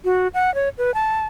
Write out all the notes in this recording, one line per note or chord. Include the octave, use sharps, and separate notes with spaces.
F#4
F#5
C#5
B4
A5